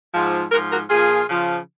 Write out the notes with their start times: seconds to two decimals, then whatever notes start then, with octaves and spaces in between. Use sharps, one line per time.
0.14 G#2 F3
0.52 G#2 F#4 A#4
0.57 F3
0.71 F#4 A#4
0.89 A#2 F3 F4 G#4
1.29 C#3 F3